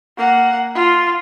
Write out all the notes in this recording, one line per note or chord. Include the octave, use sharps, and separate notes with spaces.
A#3 F#5
F4